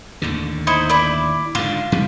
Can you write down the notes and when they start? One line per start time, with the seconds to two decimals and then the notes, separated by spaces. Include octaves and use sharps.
0.22 D#2 A2 D3
0.67 D#4 E4 C5
0.90 E4 D5
1.55 G#2 D3 F4
1.92 B2 F3 G3